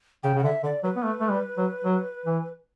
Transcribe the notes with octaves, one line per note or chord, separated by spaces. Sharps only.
C#3 G5
C#3
F#5
D3 E5
D3 D5
F#3 B4
B3
A3
A3
G3
F#3
F#3
E3